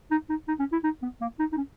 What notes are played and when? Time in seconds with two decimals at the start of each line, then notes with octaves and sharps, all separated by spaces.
0.11 D#4
0.30 D#4
0.48 D#4
0.59 C#4
0.72 E4
0.84 D#4
1.02 B3
1.21 A#3
1.39 D#4
1.52 D#4
1.57 C#4